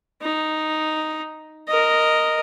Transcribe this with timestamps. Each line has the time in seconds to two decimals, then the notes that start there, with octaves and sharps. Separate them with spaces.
0.22 D#4
1.68 A#4 D#5